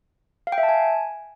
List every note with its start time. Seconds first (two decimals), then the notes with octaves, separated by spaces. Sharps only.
0.47 F5
0.52 G5
0.58 E5
0.63 A5
0.69 G#5